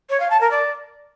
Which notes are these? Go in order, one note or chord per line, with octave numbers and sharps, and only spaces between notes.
C#5
F5
A5
A#4
D5